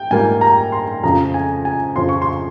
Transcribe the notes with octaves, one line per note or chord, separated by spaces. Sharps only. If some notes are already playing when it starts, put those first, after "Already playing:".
Already playing: G5
G#2 G3 A#3 F4 G#5
A#5
C6
F2 C#3 F3 A#5
G#5
G#5
F2 C#3 F3 C6
C#6
C6